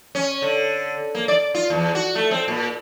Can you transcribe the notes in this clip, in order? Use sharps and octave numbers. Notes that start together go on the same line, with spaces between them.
C#4
D3
A#3
D5
F4
E2
F#4
A3
C4
A#2